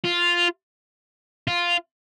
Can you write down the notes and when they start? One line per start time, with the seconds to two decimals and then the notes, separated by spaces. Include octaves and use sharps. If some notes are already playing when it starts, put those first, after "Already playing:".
0.04 F4
1.48 F4